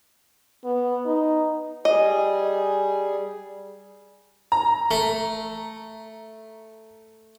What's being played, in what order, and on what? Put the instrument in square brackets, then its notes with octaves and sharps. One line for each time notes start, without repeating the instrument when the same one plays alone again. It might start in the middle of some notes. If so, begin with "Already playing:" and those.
[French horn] B3
D#4
[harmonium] G3 G#4 [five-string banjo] D#5
[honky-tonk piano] A#5
[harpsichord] A3